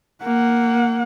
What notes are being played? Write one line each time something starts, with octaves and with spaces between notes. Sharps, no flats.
A#3 F#5